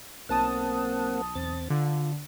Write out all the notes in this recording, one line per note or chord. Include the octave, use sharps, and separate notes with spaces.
B1 A#3 C4 F#5 A5 D#6
E2 C4 A6
D3 F4